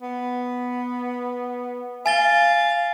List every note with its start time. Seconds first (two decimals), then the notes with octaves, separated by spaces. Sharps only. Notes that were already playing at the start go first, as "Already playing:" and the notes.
0.02 B3
2.06 F5 G#5 A6 G7